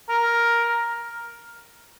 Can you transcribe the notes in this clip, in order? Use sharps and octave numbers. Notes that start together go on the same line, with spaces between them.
A#4